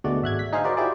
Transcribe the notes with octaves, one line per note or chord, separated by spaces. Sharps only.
D2 B2 G#3 A3 F#4 D5
G#1 E5 F#6 G#6
B6
D#4 G#4 C5 F5
F#4 G#4 A#4 C5 D5
E4 F4 G4 G#4 C5 D5